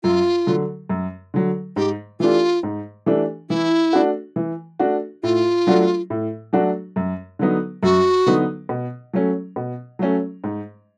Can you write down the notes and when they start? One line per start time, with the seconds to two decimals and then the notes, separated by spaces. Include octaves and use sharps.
0.03 F#2 F4
0.47 D3 F#3
0.89 F#2
1.34 D3 F#3
1.76 G#2 G4
2.20 E3 A3 D4 F4 G4
2.63 G#2
3.06 E3 A3 D4 G4
3.50 E3 E4
3.93 A3 D4 F#4
4.36 E3
4.80 A3 D4 F#4
5.23 A2 F4
5.67 F#3 A3 D4 F#4
6.10 A2
6.53 F#3 A3 D4 F#4
6.96 F#2
7.39 D3 F#3 B3 D#4
7.83 F#2 F#4
8.26 D3 F#3 B3 D#4
8.69 B2
9.14 F#3 A3 C#4
9.56 B2
9.99 F#3 A3 C#4
10.44 G#2